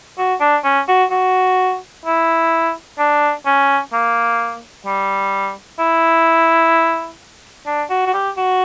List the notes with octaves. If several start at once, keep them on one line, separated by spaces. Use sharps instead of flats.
F#4
D4
C#4
F#4
F#4
E4
D4
C#4
A#3
G3
E4
D4
F#4
F#4
G4
F#4